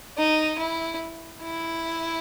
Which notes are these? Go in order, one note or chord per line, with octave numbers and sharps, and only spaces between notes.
D#4
E4
E4